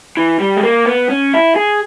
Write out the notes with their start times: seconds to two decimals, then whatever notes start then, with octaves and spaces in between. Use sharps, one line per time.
0.17 E3
0.40 G3
0.58 G#3
0.64 A#3
0.86 B3
1.10 C#4
1.34 E4
1.56 G#4